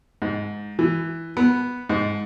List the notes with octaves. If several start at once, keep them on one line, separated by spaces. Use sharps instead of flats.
G#2
E3
B3
G#2